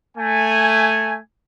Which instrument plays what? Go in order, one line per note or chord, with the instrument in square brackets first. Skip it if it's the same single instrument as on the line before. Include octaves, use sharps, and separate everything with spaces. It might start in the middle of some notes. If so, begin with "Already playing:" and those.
[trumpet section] A3 G#5